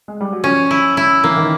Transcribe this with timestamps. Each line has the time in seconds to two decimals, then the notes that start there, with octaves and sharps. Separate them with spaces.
0.08 G#3
0.21 G3
0.32 F#3
0.44 F3 C#4
0.71 E4
0.97 E4
1.24 E3 A#3
1.37 D#3